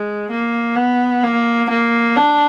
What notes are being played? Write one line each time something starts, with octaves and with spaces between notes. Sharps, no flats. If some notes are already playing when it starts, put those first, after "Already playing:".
Already playing: G#3
A#3
B3
A#3
A#3
D4